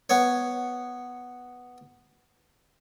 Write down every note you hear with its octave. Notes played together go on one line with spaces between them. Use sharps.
B3 C#5